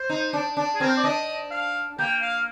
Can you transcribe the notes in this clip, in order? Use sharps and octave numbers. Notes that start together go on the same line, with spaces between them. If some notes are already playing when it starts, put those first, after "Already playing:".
Already playing: C5
D#4
D4
D4
G#4
C4 A#4
C5
D5
D4 D#5
F5
A#3 G5
F5